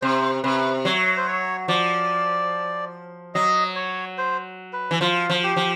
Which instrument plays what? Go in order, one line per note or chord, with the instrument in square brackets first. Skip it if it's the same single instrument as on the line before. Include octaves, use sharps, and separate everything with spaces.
[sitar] C3 [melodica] C5
[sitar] C3 [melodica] B4
[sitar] F#3 [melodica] C#5
[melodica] C5
C#5
[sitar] F3 [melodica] D5
[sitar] F#3 [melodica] D#5
[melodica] C#5
C5
B4
[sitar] E3
[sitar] F3 [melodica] F4
[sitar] F3
[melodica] G4
[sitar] F3